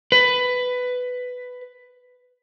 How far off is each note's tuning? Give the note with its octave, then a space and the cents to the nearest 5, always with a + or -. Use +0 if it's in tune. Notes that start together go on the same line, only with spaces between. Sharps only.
B4 +10